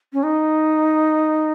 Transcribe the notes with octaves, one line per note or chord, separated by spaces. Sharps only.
C#4
D#4